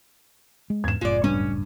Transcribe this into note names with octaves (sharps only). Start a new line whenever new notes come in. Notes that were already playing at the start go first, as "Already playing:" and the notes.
G#3
E2 G#2 G#6 E7
F#1 C#2 A2 G#3 F4 D5
G2 C#4